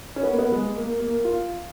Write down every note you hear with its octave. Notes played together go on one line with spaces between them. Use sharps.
C#4
B3
A#3
B3
G#3
A#3
A#3
F4